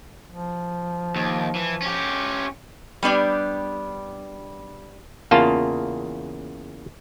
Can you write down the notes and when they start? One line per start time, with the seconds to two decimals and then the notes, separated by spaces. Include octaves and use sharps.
0.31 F3
1.16 D#2
1.55 E3
1.82 C#4 G4
3.03 G3 B3 D4 G4
5.31 E2 C#3 A#3 F4 A5